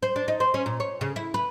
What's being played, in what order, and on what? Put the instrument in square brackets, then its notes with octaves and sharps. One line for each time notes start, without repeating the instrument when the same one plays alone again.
[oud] C5
D4
D#4
C5
C#4
A#2
C#5
C#3
E4
B4